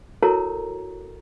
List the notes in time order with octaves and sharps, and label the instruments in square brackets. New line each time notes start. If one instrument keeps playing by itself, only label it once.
[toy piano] E4 F#4 A4 A#4 C#5 A#5